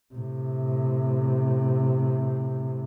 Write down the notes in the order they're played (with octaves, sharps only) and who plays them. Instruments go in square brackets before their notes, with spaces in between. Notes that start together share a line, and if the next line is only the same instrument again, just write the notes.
[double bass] A2 C3